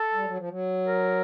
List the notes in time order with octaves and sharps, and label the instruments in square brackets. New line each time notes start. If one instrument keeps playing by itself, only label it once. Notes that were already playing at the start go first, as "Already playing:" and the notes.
Already playing: [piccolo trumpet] A4
[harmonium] G3
F#3
F3
F#3
[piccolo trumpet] A#4